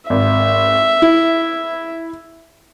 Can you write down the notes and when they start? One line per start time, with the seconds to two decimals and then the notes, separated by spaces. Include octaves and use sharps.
0.10 G#1 E5
1.02 E4